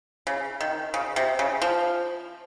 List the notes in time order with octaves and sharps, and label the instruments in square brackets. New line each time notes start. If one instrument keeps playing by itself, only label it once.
[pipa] C#3
D#3
C#3
C3
C#3
F3